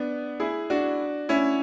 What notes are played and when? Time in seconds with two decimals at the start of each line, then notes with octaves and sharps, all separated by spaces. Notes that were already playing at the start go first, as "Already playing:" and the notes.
Already playing: B3 D4
0.40 E4 G#4
0.70 D4 F#4
1.29 C#4 E4